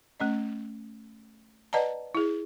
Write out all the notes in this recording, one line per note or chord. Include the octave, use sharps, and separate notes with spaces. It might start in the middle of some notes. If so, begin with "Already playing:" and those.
A3 C#4 D#5
B4 D5 D#5 F#5 A5 A#5
E4 G#4